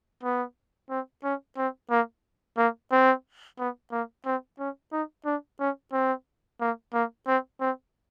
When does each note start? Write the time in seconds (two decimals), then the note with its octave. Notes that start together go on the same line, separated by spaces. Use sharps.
0.23 B3
0.89 C4
1.23 C#4
1.57 C4
1.90 A#3
2.57 A#3
2.91 C4
3.58 B3
3.92 A#3
4.25 C4
4.59 C#4
4.92 D#4
5.25 D4
5.59 C#4
5.92 C4
6.60 A#3
6.93 A#3
7.27 C4
7.60 C4